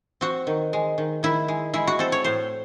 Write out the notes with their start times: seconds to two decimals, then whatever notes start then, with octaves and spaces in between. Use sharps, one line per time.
0.21 C4 F#4
0.47 D#3
0.73 G#3
0.98 D#3
1.23 D#3 E4
1.48 G#3
1.74 G#3 E4
1.87 F#4
1.99 C4 A4
2.12 C#5
2.24 A2 C5